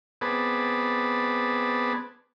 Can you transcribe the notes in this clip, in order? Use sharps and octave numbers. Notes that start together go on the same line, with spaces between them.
B3 C4 G#4 B4 D5 A5